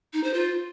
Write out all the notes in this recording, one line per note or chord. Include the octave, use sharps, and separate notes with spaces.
D#4
C5
F4